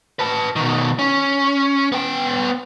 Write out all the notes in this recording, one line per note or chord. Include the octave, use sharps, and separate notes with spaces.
B4 A5
B2 D#3
C#4
B3 G5